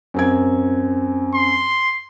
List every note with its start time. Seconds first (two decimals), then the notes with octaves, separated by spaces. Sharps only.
0.14 F#2 C4 G#6
1.34 C6